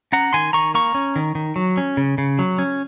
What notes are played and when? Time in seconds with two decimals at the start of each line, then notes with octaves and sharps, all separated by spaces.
0.12 C#4 F#5 A#5
0.33 D#3 G#5 C6
0.53 D#3 A#5 C#6
0.74 A#3 A#5 C#6
0.95 C#4
1.16 D#3
1.35 D#3
1.56 F#3
1.77 C#4
1.97 C#3
2.18 C#3
2.39 F#3
2.59 C#4